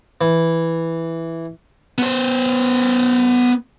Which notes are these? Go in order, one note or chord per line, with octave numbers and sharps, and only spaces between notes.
E3
B3 C5